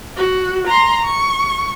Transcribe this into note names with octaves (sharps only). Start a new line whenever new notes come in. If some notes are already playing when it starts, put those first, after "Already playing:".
F#4
A#5 C6
C#6